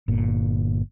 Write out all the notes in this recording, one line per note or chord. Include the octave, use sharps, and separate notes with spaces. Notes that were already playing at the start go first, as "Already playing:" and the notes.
G1 A#2